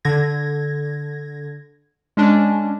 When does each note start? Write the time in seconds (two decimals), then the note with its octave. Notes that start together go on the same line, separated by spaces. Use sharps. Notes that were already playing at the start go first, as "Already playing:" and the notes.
0.05 D3 G#6 A#6
2.17 G#3 C#4 D4